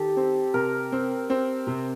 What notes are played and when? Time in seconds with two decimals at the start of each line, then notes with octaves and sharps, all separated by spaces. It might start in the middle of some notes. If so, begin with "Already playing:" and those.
Already playing: D#3 G4 A4
0.17 C4
0.54 C3 A#4
0.92 C4
1.30 C4
1.67 C3